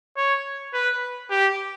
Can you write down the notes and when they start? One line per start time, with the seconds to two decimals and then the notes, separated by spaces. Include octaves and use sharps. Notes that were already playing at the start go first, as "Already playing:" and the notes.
0.17 C#5
0.73 B4
1.30 G4